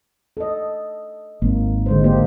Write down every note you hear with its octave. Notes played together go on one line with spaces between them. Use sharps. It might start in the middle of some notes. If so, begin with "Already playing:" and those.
A4 D#5
G#1 A#3
D3 G#3 C5
A#3 G4 C5